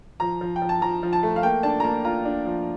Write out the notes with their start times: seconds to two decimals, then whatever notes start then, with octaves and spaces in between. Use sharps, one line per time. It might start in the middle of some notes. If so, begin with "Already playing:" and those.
0.20 F3 A#5
0.41 F3
0.56 G5
0.62 F3
0.69 A5
0.82 F3 A#5
1.03 F3
1.13 A5
1.23 A3
1.36 F5
1.43 A#3 G5
1.63 D4 A5
1.80 A#5
1.84 A#3 A5
2.04 F4 A#5
2.25 D4
2.45 F3